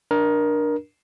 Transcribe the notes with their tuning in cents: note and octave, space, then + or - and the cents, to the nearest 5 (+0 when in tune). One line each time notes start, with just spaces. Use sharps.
D4 +10 A#4 +20